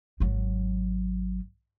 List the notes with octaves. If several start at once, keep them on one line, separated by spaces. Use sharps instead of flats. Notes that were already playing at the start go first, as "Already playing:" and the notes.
G#1 F#3